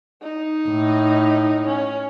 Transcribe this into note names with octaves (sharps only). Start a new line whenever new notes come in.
D#4
A2
C#4